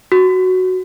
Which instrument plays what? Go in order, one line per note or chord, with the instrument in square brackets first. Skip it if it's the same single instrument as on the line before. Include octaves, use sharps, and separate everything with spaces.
[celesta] F#4